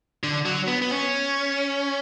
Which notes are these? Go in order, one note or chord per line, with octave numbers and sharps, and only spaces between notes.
D3
F#3
B3
B3
C#4